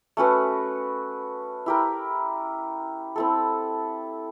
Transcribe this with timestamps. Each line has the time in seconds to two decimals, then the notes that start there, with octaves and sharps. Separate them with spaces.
0.17 A3 C#4 F#4 B4
1.66 E4 G4 A#4
3.16 C4 E4 A4